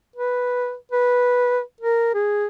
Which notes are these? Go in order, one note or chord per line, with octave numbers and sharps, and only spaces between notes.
B4
B4
A#4
G#4